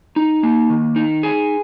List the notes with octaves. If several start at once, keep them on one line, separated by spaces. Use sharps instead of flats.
D#4
A#3
D#3
D#4
G#4